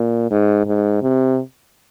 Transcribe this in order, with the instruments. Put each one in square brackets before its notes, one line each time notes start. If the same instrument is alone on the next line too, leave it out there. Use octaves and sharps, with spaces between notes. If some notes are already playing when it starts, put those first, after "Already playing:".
Already playing: [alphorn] A#2
G#2
G#2
C3